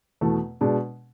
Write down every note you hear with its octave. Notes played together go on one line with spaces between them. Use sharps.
E2 B2 A3
B2 G#3 D4